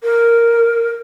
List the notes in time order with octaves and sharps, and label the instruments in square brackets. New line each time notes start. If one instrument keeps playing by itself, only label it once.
[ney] A#4